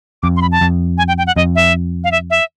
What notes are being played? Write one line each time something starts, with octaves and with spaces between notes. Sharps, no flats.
F2 D6
C6
B5
A5
F2
G#5
G5
G5
F#5
F2 D#5
E5
F5
E5
E5